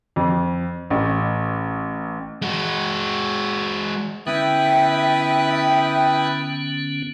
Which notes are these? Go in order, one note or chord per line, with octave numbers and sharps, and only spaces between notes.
F2
A1
G#3 F#4
D3 B3 C#4 E4 B4 E5 G5 D#6